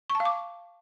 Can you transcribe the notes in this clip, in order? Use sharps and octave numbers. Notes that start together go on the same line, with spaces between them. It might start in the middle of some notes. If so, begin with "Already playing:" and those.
C#6
A5
F5
D6